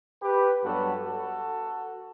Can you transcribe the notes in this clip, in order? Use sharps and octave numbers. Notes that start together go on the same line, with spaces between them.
G4 B4
G2 F#3 B3 F#4 A4
F#4 A4